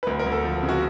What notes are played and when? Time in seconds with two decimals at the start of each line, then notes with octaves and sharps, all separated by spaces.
0.03 B4
0.07 D2 A#4
0.19 A#4
0.26 D2
0.32 A4
0.44 F3
0.63 C#3
0.69 F#4